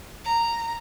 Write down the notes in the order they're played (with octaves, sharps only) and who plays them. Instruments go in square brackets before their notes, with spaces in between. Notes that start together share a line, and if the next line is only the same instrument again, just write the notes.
[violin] A#5